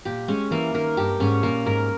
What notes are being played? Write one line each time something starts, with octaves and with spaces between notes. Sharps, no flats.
A#2 G4
G#3 C#4
E3 A#3
D#3 A#4
G2 G4
G#2 C#4
A#2 A#3
G#2 A#4